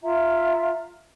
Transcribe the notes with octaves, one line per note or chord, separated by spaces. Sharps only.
F4 E5 A#5